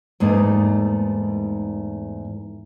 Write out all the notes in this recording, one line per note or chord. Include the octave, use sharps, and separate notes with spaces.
E2 G#2 A3 A#3 D#4